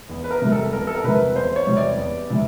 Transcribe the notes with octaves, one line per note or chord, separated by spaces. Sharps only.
E2
B4
A#4
C3 E3 G3
A4
E2 A#4
A4
A#4
C3 E3 G3 B4
E2 C5
C#5
C3 E3 G3
D5
E2
C3 E3 G3